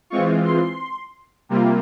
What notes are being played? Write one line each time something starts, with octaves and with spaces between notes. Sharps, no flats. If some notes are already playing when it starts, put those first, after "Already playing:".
E3 G#3 C4 F4 C#6
C6
C3 G3 A#3 F4